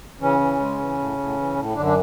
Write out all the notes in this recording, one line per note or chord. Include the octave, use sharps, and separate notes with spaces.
C#3 E3 C#4
E3
G#3
E3
A2
A2
E3
A2
F#2 D3 D4
D4